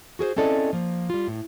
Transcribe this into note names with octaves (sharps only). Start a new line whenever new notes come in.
F#4 G#4 A#4 C5
C4 C#4 E4 A4 D5 D#5
F3 A#3
G3 F4
A2